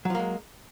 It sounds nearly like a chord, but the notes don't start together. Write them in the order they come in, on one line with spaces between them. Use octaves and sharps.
F#3 F3 A#3 G#3